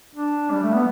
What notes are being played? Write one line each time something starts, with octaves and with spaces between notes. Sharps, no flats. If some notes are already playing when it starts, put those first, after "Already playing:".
D4
G3
A3
B3